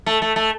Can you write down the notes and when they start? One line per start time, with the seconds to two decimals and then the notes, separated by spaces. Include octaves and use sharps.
0.06 A3
0.22 A3
0.36 A3